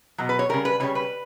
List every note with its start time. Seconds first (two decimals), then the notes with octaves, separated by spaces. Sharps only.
0.18 B2 F#3
0.29 B4
0.39 C#5
0.49 C#3 G3 A#4
0.65 B4
0.80 C#3 G3 C#5
0.95 B4